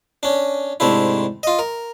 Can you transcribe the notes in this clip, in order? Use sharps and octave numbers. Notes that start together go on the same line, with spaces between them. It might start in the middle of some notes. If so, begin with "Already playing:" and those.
C#4 D4
G#2 C3 A3 D4 E4
F4 D#5
A#4